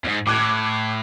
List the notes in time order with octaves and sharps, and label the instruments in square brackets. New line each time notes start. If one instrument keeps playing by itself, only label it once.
[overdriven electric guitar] E2 G#2
[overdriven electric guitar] A2 [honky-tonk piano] D6 F#6 G#6